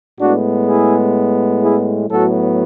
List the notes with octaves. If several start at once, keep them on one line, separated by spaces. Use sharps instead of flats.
A2 G#3 B3 D4 F#4
E4 G#4
E4 G#4
A2 F#3 B3 F#4 A4